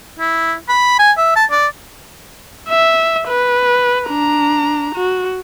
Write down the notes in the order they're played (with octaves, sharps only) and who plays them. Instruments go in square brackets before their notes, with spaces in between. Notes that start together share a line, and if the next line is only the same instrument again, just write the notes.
[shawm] E4
B5
G#5
E5
A5
D5
[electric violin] E5
B4
D4 A#5
F#4